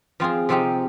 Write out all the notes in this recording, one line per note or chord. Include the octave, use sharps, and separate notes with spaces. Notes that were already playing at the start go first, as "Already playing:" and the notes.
F3 C4 F4 G#4
C3 F3 C4 D#4 G4